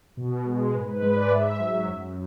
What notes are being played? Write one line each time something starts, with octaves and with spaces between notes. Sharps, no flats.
B2
G#3
G#2 B4
B4
G#3 B4
D5
G#2 E5
F#3
F#2